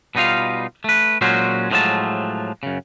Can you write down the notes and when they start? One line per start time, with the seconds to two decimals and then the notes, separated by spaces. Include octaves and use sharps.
0.15 B2 G3 D#4 F4 F5
0.84 A3 B4
1.21 A#2 F#3 G#3 C#4 F#4 C5
1.71 F#2 A2 F3 F#3 G#3 A5
2.63 F#2 C#3